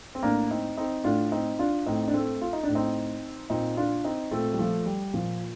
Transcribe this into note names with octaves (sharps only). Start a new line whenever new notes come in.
C4
A2 A#3 D4
C4 D#4
C4 D#4
A2 D4 F4
C4 D#4
D4 F4
A2 C4 D#4
D4
A3 C4
F4
D#4
D4
A2
C4 D#4
A#2 C4 D#4
D4 F4
C4 D#4
A#2 A3 C4
G3
F3 A3
G3
A#2 F3